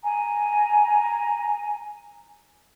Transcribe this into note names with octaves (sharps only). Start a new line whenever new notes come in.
G#5 A#5